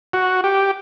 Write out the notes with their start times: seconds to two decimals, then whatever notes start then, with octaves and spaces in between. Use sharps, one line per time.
0.13 F#4
0.44 G4